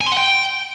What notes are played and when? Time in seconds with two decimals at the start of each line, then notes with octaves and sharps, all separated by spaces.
0.01 G#5
0.06 C6
0.12 F#5
0.17 G5